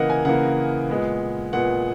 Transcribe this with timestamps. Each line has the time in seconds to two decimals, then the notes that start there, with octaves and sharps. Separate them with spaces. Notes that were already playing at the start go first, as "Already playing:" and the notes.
Already playing: C#3 E3 A#3 A#4 D#5 F#5
0.10 G#5
0.25 C#3 E3 A#3 F#5
0.89 A#2 G#3 B3
1.53 A#2 G#3 B3 F#5